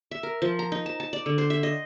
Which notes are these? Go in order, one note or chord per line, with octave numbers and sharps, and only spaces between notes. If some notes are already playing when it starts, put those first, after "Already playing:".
E5
A#4
F3
A#5
D#4
A5
A5
D5
D3
C5
E5
D#5